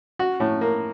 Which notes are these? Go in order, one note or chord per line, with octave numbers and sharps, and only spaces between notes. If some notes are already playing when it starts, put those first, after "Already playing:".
F#4
A2
A#3